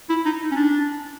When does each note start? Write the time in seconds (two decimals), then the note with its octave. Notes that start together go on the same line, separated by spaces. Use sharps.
0.09 E4
0.26 D#4
0.52 C#4
0.56 D4